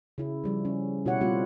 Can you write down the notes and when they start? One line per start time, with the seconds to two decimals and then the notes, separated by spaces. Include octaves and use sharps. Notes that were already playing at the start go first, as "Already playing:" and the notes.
0.18 C#3 E4
0.44 F3 G3
0.65 C#4
1.06 B2 E4 G4 C#5 F#5
1.21 G3 A3 C4 F4 F#4